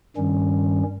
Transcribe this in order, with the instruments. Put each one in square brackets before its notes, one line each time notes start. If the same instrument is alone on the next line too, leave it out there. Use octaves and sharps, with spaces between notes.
[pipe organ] G2 D#3 G3 C#4